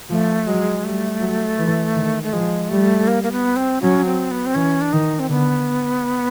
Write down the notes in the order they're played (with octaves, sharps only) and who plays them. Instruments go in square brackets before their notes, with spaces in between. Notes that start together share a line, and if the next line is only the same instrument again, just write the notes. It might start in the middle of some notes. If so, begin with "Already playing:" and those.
[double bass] F3 [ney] A3
[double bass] F#3 [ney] G#3
[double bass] G3 [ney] A3
[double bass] F#3
E3
D#3
[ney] A3
[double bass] F3 [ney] G#3
[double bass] G3 [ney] A3
[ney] A#3
A#3
B3
C4
[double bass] F#3 [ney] C#4
[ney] C4
B3
C4
[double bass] E3 [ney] C#4
[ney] D4
[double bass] D#3 [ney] D#4
[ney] C4
[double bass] D3 [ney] B3